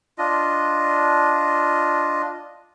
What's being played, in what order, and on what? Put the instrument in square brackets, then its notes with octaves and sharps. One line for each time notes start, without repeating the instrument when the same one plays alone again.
[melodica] D4 F4 D#5